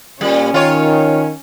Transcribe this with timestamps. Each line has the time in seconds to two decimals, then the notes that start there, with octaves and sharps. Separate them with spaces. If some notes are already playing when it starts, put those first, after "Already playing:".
0.21 A#2 G3 C#4
0.54 D#3 F4 C#5